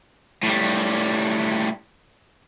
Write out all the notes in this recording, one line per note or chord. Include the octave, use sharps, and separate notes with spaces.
A2 G3